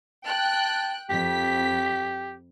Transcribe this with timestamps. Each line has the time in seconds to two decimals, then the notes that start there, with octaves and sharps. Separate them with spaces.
0.26 G5 A5 F#6
1.10 F2 G4 B6